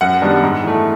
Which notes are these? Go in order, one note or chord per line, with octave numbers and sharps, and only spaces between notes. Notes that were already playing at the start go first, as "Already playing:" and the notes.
F#2 F#5
D#3 G3 B3 D4
G#2
E3 A3